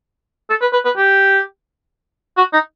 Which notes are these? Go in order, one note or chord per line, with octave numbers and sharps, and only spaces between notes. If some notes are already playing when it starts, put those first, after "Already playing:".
A4
B4
B4
B4
G4
F#4
D#4